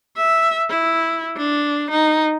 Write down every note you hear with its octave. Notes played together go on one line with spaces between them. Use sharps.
E5
E4
D4
D#4